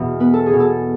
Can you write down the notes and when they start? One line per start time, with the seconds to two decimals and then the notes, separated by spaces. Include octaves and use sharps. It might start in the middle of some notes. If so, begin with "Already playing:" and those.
Already playing: E2 B2
0.20 B3 B4
0.33 A4
0.46 G#4
0.53 B2
0.60 A4